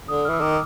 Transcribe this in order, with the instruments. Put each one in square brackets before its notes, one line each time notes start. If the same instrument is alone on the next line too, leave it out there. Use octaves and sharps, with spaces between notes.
[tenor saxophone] D3 [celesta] D#6
[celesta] F6
[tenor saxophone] E3 [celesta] E6
[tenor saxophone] D#3 [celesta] D6